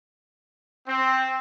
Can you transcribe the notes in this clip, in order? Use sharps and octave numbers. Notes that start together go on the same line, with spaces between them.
C4